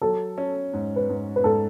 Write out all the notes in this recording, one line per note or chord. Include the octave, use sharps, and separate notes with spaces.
F#3 A4
C#4
G#2
B4
G#2
B4
G#2 A4